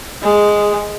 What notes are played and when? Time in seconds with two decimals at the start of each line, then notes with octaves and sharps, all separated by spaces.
0.23 G#3